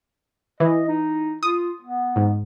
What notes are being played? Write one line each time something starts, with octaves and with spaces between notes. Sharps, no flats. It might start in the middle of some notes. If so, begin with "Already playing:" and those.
E3 D#5
D#4
F4 D#6
B3
G#2